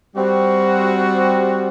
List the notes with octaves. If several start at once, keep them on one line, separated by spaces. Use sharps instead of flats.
G3 C4 F#4